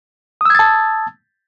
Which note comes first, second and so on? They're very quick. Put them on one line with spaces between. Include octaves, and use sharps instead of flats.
D#6 E6 G#6 A6 A5